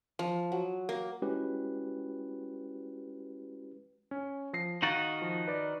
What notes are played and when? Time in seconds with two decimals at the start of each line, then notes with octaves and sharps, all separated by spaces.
0.19 F3
0.52 F#3
0.89 A#3
1.22 G#3 C#4 E4 F#4 G4 B4
4.11 C#4
4.53 F3 A#6 C7
4.82 D#3 D#4 F#4 F5 A6
5.22 F3
5.47 B4 D5